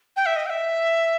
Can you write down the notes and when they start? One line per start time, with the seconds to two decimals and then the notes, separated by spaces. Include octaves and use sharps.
0.16 G5
0.26 E5
0.36 D#5
0.46 G5
0.50 E5